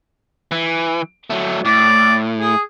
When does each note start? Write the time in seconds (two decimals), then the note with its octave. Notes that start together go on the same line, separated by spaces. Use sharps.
0.51 E3
1.30 F#3 A3
1.65 A2 D5
2.40 G#4